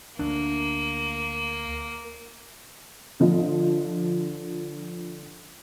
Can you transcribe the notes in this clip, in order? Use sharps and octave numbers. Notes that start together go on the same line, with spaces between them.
D2 A#3 D4
D3 F3 D#5